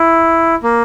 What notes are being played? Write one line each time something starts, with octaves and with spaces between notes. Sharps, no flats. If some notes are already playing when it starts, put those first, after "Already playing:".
Already playing: E4
A#3